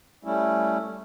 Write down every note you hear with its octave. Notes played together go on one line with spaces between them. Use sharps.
G3 A3 C#4 E4